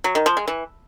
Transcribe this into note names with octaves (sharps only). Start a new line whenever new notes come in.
F#3
D#3
F3
G#3
E3